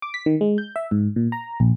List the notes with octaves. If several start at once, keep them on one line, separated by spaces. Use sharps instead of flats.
D6
B6
D#3
G#3
G6
E5
G#2
A#2
A#5
A#1